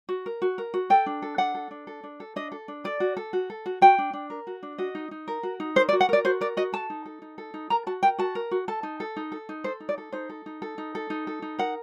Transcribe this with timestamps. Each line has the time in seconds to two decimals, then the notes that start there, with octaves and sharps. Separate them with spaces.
0.09 F#4
0.26 A#4
0.42 F#4
0.58 A#4
0.74 F#4
0.90 A4 G5
1.06 D4
1.22 A4
1.38 D4 F#5
1.55 A4
1.71 D4
1.87 A4
2.04 D4
2.20 A4
2.36 D4 D#5
2.52 A4
2.68 D4
2.84 A4 D5
3.00 F#4
3.17 A4
3.33 F#4
3.50 A4
3.66 F#4
3.82 F#4 G5
3.98 D4
4.13 D4
4.30 A#4
4.47 F#4
4.63 D4
4.78 F#4 D#5
4.95 D#4
5.11 D#4
5.28 A#4
5.43 F#4
5.60 D#4
5.76 A#4 C5
5.89 D5
5.93 F#4
6.01 F#5
6.09 A#4 D5
6.25 F#4 C5
6.41 A#4 D5
6.57 F#4 D#5
6.73 A4 A5
6.90 D#4
7.06 A4
7.22 D#4
7.38 A4
7.54 D#4
7.70 A#4 A#5
7.87 F#4 A5
8.03 A#4 G5
8.19 F#4 A5
8.35 A#4
8.51 F#4
8.68 A4 A5
8.83 D#4
9.00 A4
9.17 D#4
9.32 A4
9.49 D#4
9.64 A4 C5
9.80 D#4
9.89 D5
9.98 A4
10.13 D#4 C5
10.30 A4
10.46 D#4
10.62 A4
10.78 D#4
10.95 A4
11.10 D#4
11.27 A4
11.42 D#4
11.59 A#4 F#5